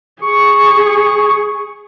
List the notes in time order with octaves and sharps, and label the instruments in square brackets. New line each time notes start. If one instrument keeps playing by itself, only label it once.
[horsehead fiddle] G#4 [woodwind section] C#6